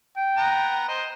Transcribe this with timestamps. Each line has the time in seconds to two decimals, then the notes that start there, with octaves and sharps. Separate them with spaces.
0.17 G5
0.37 B3 A#5
0.88 C5 D#5